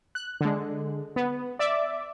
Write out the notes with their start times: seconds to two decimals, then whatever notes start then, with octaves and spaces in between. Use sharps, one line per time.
0.15 F#6
0.41 D3 G#3
1.16 B3
1.59 D5 E5 D6